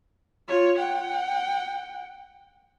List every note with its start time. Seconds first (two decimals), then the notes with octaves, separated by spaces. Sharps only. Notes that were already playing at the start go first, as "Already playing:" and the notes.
0.48 F4 C#5
0.79 F#5 G5